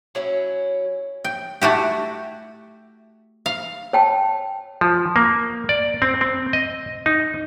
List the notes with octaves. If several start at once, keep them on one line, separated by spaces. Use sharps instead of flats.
F#3 C#4 E4
G5
A3 E4 F#4 G4
F5
C#5 G5 A5
F3
A#3
D5
C4
C4
D#5
D#4